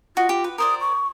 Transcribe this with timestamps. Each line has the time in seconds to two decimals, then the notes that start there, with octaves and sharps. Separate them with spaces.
0.17 F4 F#4 D#5
0.29 G4
0.44 B4
0.58 A#4 C5 D5 D#6
0.81 C#6